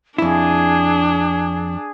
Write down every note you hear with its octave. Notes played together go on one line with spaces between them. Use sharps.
F2 D4 E4 G#4